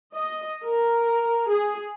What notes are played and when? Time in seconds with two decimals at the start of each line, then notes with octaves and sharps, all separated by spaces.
0.13 D#5
0.63 A#4
1.47 G#4